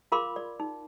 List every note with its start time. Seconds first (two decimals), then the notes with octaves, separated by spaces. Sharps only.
0.12 F4 A#4 F5 B5 C6 D6
0.36 D5
0.60 D#4